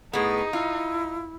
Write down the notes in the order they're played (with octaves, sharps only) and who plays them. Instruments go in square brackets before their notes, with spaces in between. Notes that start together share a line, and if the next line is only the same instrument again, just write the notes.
[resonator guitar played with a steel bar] A2 B3 [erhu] D#4 [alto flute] G#4
[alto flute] E4 [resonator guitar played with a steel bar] F4